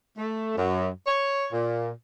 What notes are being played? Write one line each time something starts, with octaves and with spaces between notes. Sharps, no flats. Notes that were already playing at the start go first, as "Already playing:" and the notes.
A3
F#2
C#5
A#2